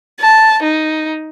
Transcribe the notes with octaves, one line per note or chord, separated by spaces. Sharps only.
A5
D#4